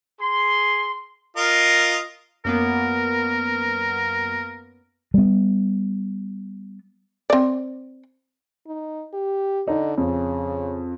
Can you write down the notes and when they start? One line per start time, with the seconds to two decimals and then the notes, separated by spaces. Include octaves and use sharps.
0.20 G#4 C6
1.37 F4 A#4 D#5
2.45 F#2 A#3 B3 A#4
5.14 G3 B3
7.30 C4 D5
8.67 D#4
9.13 G4
9.68 D3 D#4
9.98 F2 C#3